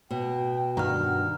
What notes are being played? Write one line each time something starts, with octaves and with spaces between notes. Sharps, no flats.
B2 G5
G2 D#3 F#5 A#5 F6